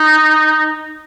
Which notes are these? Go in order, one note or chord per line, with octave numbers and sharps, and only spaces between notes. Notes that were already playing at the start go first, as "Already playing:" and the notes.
Already playing: D#4